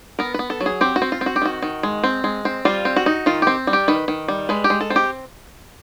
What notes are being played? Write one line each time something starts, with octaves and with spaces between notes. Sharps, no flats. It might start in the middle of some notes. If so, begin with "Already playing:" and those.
B3 A#4
B3 B4
A4
F#3
G#4
C4 G4
F#4
C4
F4
C4
F#4
G4
D#3 F#4
D#3
G#3
C4
G#3
C4
G3 F4
C4
F#4
D#4
D#3 F4
C4 G4
G3
G4
D#3 B4
D#3
G3
G#3 B4
G4
G#3
A4
C4
G4